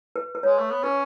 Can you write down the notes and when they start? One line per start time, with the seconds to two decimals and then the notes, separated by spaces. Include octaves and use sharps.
0.16 B4
0.35 B4
0.43 G#3 C#5
0.58 A3
0.71 B3
0.83 C#4 B4